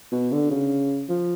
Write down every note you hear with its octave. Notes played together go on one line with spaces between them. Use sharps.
B2
D3
C#3
F3